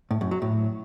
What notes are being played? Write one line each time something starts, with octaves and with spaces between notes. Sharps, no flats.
A2
F#2
F#3
A2